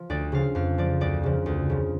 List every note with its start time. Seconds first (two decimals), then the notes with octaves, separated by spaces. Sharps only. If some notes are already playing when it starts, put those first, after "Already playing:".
Already playing: F3
0.10 D2 D5
0.32 C#3 F3 F5
0.55 F2 F5
0.78 F3 D5
1.01 D2 D5
1.23 C#3 F3
1.46 D2
1.70 C#3 F3